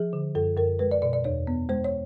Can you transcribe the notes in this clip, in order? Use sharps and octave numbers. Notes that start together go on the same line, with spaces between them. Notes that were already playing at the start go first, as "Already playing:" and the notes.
Already playing: F3 G#4
D3
F#2 A4
F#2 A#4
G#3 B4
D5
B2 D5
D5
E2 C#5
B3
G#3 C5
C#5